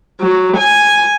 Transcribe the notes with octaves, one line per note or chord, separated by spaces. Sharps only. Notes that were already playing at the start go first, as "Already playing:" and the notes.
F#3
G#5